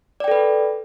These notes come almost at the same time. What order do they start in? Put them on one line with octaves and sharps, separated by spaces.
D5 G5 A4 B4